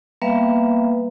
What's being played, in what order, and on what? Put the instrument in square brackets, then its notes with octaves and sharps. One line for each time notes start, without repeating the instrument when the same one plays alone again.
[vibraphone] G3 A#3 B3 B4 E5 F5